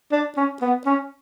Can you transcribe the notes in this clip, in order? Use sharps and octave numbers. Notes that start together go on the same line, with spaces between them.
D4
C#4
B3
C#4